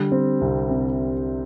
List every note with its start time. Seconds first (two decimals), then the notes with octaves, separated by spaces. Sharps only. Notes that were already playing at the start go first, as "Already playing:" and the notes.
Already playing: D3 G3
0.12 C4
0.41 C2
0.70 C3